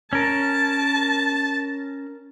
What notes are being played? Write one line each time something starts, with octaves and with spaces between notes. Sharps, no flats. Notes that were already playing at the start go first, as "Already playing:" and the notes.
C#4 A#4 A5